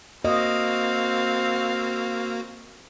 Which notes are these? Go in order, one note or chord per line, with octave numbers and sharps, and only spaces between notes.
A#3 C4 F#4 D#5 F5